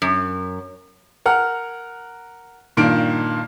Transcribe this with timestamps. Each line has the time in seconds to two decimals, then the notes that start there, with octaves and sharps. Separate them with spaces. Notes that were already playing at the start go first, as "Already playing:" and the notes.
0.02 F#2
1.26 A#4 F#5 F6
2.77 G2 A#2 D#3 D7